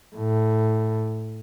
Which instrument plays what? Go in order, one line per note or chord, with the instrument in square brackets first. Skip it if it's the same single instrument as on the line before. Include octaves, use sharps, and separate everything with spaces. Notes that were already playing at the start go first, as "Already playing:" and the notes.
[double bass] A2